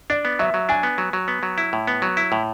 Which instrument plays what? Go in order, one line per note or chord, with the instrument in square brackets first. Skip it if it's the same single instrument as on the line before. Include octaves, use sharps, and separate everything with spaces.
[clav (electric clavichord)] D4 [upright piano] D5
[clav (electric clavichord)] B3
[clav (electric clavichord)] F#3 [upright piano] E5
[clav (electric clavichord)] F#3
[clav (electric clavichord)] D4 [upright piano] G#5
[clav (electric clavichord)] B3
F#3
F#3
B3
F#3
E4
A2
B3
F#3
E4
A2